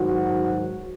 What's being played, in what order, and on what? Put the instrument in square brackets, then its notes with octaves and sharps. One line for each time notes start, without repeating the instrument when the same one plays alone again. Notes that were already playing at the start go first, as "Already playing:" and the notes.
Already playing: [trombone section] G#2 D#3 F#3 F#4